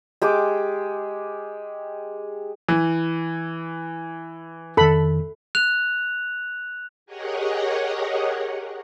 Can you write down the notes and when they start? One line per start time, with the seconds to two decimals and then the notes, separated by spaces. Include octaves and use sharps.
0.22 G#3 G4 D6
2.69 E3
4.77 F2 D#3 A4 B5
5.55 F#6 F7
7.06 G4 G#4 A#4 C#5 D#5 F#5